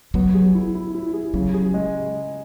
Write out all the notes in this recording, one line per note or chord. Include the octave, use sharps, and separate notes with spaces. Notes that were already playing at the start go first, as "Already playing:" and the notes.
F#3 B3
G#4
E4
E4
E4
G#4
C#3 F#3
G#4
G#3